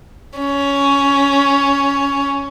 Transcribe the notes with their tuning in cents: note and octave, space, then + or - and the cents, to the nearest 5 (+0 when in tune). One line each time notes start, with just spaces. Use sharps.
C#4 +10